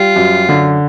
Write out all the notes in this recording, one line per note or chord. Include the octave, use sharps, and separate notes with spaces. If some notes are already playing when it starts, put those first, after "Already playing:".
Already playing: G3 F4
F#2
D3